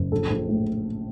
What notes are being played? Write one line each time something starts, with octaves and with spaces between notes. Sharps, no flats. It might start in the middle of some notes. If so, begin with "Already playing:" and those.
Already playing: F#1
A#1 A4
A#1
A2